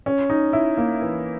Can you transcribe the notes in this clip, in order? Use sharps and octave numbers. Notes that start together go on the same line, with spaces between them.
C#4
D#4
E4
A#3
E3